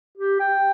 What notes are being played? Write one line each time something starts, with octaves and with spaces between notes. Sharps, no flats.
G4
G5